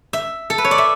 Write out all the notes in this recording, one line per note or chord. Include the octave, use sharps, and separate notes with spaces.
E5
A4
B4
C#5
D5
E5